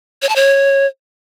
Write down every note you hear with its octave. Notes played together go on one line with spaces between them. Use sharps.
C#5
A5
C#5